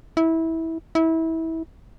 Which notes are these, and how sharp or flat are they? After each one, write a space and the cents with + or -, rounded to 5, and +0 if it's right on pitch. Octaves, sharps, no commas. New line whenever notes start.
E4 -20
E4 -25